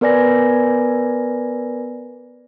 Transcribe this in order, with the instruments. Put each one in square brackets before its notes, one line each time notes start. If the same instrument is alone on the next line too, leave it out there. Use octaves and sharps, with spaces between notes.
[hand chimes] B3 A#4 B4 D5 G#5 A#6